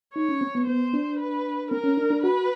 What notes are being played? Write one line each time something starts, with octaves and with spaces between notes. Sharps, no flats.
D#4 C#5
C#4
C4
B3
B3 C5
D4
B4
C4 A#4
C#4
D4
D4
F#4 B4